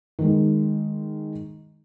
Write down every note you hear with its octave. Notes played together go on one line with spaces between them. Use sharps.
D#3 G#3